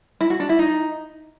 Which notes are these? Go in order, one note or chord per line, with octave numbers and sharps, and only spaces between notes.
E4
F#4
D4
E4
D#4